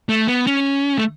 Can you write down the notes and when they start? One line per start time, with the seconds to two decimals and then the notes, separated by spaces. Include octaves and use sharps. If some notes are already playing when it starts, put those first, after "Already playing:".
0.09 A3
0.28 B3
0.47 C#4
0.98 A3